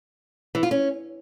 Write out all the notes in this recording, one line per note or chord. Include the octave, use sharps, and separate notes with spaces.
E3
F4
C#4